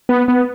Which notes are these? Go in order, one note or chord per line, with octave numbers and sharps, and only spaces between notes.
B3
B3